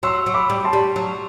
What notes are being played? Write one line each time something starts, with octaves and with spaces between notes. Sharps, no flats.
F#3 C6 E6
F#3
B5 D6
G3
A5 C6
G3
F#3